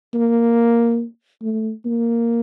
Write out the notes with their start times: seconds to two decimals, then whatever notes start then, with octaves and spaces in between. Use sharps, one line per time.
0.14 A#3
1.42 A3
1.85 A#3